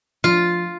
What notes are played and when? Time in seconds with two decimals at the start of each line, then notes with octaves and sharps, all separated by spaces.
0.24 F3 F4